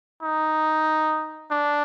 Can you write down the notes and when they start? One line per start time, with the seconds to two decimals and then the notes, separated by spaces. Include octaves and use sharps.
0.23 D#4
1.51 D4